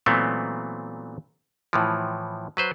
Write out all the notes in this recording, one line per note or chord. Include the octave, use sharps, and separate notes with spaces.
A#2 E3 F#3 A3 B3 C4
A2 E3 F3
F#3 B4 C5